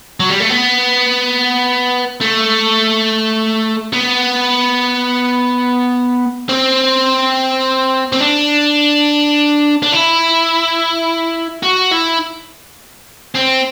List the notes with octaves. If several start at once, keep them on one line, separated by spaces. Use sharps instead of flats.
F#3
G3
A3
B3
A3
B3
C4
C4
D4
D4
E4
F#4
E4
C4